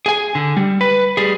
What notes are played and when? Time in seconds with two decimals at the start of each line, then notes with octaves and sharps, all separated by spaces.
0.06 G#4 G#5
0.35 D3
0.57 G3
0.81 B4
1.17 G3 G#4